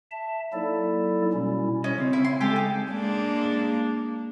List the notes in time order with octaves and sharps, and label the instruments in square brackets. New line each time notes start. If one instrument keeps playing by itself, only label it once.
[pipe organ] E5 A5
F#3 A#3 D#4 E4 A4 D5
B2 G3 C#4 E4
[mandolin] C#4 [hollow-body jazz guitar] D#5
[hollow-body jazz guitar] C#3 C4
[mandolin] E4
C6
[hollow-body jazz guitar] G#3 [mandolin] G4 A4 G#5
[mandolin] D#4
[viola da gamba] G#3 A#3 D4